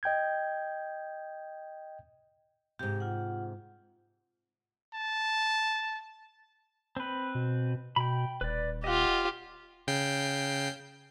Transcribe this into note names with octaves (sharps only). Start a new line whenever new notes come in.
D#5 G5 G6 G#6
G#2 C3 G4
F4 F#5
A5
C4 B4
B2
B2 G5 B5
D#1 B4 D5
F4 G4 D#5 F#5
C#3 G5 C7